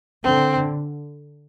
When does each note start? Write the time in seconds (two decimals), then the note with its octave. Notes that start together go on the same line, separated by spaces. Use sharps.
0.24 D3 C4